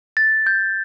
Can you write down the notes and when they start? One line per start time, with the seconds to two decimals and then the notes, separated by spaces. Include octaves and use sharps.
0.17 A6
0.46 G6